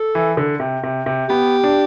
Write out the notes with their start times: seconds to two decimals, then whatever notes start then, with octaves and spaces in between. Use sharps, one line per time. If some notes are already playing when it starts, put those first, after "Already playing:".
Already playing: A4
0.15 E3
0.37 D3
0.60 C3
0.84 C3
1.06 C3
1.29 B3 G4
1.64 D4